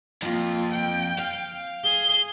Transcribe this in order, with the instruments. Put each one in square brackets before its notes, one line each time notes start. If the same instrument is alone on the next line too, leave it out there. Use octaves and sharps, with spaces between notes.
[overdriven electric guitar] F2 [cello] A#3 F4
[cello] G5
[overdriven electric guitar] F5
[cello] G#4 [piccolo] G7